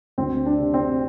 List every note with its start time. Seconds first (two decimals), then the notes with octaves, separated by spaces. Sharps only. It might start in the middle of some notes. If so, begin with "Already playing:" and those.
0.18 D2 C4
0.46 D4
0.59 C3
0.74 C4